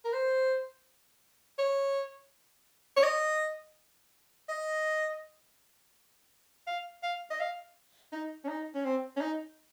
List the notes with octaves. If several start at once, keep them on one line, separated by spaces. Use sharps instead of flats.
A#4
C5
C#5
C#5
D#5
D#5
F5
F5
D#5
F5
D#4
C#4
D#4
C#4
C4
C#4
D#4